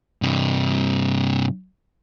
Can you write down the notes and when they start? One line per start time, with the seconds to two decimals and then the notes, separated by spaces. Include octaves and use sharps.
0.22 G2 C3